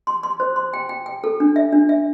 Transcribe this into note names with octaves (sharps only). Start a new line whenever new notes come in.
C6
C6
C5
C6
G5
G5
G5
A4
D4
E5
D4
E5